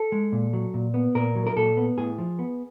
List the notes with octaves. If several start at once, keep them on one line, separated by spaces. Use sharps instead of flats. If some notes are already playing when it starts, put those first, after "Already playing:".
Already playing: A4
G#3
A#2
F#3
A#2
B3
A#2 A#4
F#3
A#4
A#2 A4
B3
A2 G#4
F3
B3